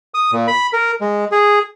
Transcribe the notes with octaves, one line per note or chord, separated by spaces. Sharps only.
D#6
A#2
B5
A#4
G#3
G#4